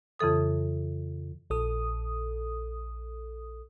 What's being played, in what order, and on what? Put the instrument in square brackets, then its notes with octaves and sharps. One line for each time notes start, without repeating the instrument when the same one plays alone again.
[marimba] F2 C#3 E3 A4 D#6
[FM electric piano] A#1 A4 D#6